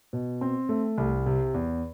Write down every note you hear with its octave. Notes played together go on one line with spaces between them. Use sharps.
B2
C4
A3
C2
C3
E2